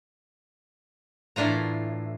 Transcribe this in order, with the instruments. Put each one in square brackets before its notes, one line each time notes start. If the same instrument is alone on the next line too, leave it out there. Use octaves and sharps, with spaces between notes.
[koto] A2 E3 D4 F4 A#5